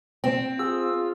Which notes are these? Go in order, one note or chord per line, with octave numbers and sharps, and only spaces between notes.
C4 G5
F4 G#4 E6